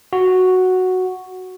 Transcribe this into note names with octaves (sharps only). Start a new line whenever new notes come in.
F#4